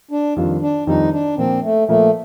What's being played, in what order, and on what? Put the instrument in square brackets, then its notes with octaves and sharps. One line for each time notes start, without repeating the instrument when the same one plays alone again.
[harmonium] D4
[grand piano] F2 D#3 G3 D4 F4
[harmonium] D4
[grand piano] F2 D#3 G3 D4 F4 [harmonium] D#4
[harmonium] D4
[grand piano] A#2 F3 A#3 [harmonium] C4
[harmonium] A3
[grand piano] A#2 F3 A#3 [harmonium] A3